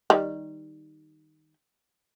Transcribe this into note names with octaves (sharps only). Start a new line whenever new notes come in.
D#3 G3